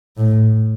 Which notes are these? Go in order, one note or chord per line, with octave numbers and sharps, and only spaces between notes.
A2